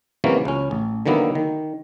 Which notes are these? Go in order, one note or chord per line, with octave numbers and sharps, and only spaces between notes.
C3 E3 F#3 G#3 A#3 C#4
C#2 C#4
A1
D3 D#3 F#3 A#3 B3 E4
D#3